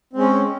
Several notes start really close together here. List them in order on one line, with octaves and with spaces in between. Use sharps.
C4 G#3 C#4